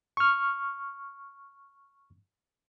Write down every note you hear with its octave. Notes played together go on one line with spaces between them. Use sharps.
C#6 F6